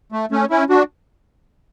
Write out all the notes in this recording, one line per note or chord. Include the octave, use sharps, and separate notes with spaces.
A3
A3 C#4
C#4 E4
D4 F#4